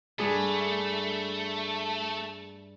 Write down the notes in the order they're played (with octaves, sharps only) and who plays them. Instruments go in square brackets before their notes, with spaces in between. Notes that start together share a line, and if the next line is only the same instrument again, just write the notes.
[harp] G2 G#4 [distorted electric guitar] A3